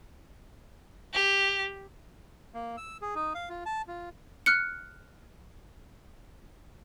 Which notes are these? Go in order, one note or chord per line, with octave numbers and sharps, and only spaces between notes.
G4
A#3
E6
G#4
D#4
F5
F4
A5
F4
F6 F#6 C#7